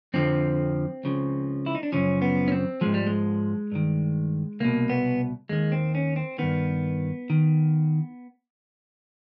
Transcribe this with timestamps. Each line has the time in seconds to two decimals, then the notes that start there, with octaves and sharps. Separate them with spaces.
0.14 F2 D3 F3 C4
1.04 C#2 C#3 F3
1.66 E4
1.75 D#4
1.83 D4
1.92 F#2 C#3 F3 C#4
2.22 B3
2.48 C#4
2.52 C4
2.81 G#2 F3 G#3
2.94 G3
3.07 G#3
3.72 G2 D#3
4.60 C2 B2 A#3
4.90 B3
5.49 D#2 D#3 G#3
5.72 C4
5.95 C#4
6.16 C4
6.38 G2 D#3 B3
7.30 D#3